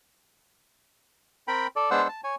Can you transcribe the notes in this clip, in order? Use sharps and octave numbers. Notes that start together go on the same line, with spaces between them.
C4 A#4 G5 B5
A4 D5
G#3 B3 D4 C5 F#5 E6
A5
C#5 G#5